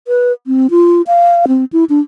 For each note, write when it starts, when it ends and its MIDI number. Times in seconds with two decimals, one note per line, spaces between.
0.08 0.32 71
0.47 0.67 60
0.71 1.02 65
1.07 1.46 77
1.48 1.65 60
1.73 1.84 64
1.89 2.00 62